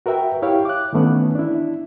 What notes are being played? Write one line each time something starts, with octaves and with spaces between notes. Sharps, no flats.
F#4 A#4 B4 E5 G5
E4 G4 C#5 F5 G5
D6 F#6
D#3 E3 A3 B3 C#4
D4 E4